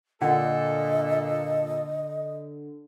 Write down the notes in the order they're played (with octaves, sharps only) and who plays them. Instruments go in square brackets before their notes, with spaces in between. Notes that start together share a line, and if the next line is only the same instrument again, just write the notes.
[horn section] A#2 A4 [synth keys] D3 [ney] D#5 [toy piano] F#5